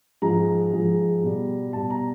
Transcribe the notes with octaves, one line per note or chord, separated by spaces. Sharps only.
G#2 F3 G#3 A#5
G#2 F3 G#3
B2 G3
B2 G3 A5
A#5